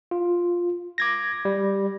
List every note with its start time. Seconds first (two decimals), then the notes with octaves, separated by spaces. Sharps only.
0.11 F4
0.98 D6 G#6 A#6
1.45 G3